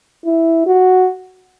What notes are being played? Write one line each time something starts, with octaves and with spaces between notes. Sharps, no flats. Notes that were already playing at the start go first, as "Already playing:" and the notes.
E4
F#4